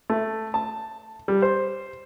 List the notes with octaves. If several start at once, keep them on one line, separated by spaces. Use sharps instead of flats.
A3
A5
G3
C5